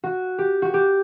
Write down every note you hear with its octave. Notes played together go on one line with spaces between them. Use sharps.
F#4
G4
F#4
G4